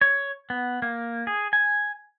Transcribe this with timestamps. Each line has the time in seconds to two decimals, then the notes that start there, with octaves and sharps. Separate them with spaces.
0.01 C#5
0.50 B3
0.82 A#3
1.27 G#4
1.53 G#5